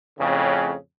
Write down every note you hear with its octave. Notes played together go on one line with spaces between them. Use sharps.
F2 A2 C#3